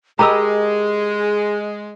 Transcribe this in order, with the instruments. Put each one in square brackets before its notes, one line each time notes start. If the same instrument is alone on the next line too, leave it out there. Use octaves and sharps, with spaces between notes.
[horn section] G#3 [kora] G4 A#4 D#5 [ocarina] G#4 [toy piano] A#5 B5 E6